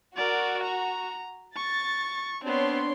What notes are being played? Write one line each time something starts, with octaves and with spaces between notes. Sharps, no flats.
F#4 A#4 D5
A#5
C#6 A6
B3 C4 D4 C#5 C6